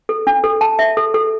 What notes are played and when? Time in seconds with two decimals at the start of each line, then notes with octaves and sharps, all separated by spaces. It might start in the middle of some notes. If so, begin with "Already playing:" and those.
0.09 A4
0.27 D4
0.44 A4
0.61 A5
0.79 E5
0.97 A4
1.14 A4